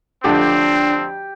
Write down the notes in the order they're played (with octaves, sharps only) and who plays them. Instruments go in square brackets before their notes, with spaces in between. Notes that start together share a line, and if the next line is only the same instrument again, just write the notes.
[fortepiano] F2 D3 A3 [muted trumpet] C4 [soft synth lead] D4 [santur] G4